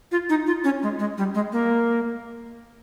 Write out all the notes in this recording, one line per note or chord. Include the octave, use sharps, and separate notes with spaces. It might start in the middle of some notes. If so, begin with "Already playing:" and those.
F4
D#4
F4
C#4
G#3
G#3
G3
G#3
A#3